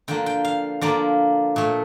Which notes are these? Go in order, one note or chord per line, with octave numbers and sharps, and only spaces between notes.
D3 F3 A#3 G5
G5
F5
D3 F3 A#3 D5
A#2 A3